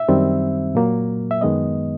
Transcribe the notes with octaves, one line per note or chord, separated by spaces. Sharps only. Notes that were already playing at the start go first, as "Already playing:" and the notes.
Already playing: E5
F#2 D#3 G3 C4
A#2 F#3 A#3
E5
F#2 D#3 G#3 B3 D#5